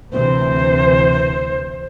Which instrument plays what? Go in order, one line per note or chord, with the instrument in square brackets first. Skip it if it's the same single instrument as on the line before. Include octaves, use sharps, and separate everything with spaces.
[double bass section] D2 C3 E3 [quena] C5